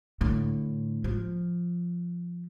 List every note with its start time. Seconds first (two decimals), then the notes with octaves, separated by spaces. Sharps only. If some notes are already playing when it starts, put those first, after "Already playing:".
0.21 A2 D3
1.04 F3